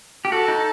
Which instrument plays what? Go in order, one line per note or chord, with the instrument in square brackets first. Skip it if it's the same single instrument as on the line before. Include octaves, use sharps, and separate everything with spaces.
[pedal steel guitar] G4
[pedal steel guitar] F#4 [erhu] A4
[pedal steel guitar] D#4